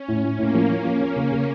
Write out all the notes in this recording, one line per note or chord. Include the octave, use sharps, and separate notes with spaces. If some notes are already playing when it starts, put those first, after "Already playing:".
Already playing: C#4
A2
A2
A2 A#3
F3
F3
F3
C#4
C#3
C#3